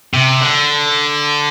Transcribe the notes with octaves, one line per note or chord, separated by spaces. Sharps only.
C3
D3